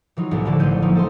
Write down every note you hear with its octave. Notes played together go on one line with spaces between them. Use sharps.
E3 F#3 D#4 F4
C2 A2 D#3 B3 E5
D3 F3 F#3 D5 E6
A1 F#3 A3 C5 G6 D#7
E3 F3 G3 A3 A#3 D#4
A4 D#5 C6